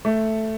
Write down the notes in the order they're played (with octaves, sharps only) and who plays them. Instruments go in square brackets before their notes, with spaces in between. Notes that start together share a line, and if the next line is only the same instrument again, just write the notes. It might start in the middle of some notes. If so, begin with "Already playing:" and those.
[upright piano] A3